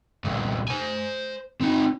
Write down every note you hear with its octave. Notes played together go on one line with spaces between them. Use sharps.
C2 A#2
C5 G#5
C4 D#4